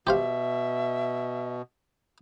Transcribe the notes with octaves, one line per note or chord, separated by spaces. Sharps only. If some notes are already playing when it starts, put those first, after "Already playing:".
B2 G4 C5 E5 F5